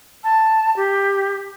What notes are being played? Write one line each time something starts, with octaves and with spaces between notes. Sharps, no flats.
A5
G4